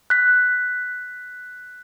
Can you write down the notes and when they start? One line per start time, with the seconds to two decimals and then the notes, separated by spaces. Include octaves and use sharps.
0.10 F#6 B6